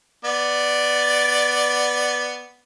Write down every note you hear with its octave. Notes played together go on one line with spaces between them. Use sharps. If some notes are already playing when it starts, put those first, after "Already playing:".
B3 D5